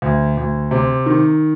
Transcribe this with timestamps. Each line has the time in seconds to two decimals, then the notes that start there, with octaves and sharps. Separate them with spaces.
0.02 D2
0.37 D2
0.71 C3
1.06 D#3